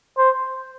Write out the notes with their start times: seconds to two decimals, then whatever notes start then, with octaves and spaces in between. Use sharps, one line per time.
0.18 C5